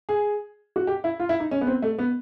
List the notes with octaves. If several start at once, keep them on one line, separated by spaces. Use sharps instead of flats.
G#4
F#4
G4
E4
F4
E4
D#4
C#4
B3
C4
A3
B3